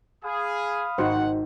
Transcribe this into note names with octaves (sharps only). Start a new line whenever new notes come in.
G#4 F5 B5 D#6
G#1 D#4 F#4 C5 F#5